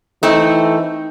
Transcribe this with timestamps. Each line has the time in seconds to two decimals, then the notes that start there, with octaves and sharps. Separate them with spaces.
0.23 E3 A3 C4 D#4